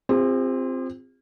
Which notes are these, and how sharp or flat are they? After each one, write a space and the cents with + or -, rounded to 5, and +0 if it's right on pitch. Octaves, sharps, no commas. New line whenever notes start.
C4 +0 F4 +0 G#4 -45